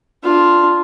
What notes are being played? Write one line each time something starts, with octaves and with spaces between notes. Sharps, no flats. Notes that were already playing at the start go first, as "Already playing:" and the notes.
D4 F4